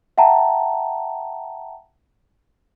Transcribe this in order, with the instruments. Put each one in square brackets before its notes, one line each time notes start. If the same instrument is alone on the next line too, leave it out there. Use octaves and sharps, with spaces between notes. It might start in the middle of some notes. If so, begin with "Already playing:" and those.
[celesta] E5 F#5 G5 A5 A#5